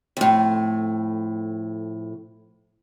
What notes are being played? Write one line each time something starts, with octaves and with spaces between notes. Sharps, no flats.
F2 A2